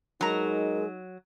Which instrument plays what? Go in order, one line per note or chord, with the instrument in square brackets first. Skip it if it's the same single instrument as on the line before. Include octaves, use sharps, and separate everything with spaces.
[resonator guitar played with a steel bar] F#3 A#5 [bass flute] G#3 [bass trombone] D#4 [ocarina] A#4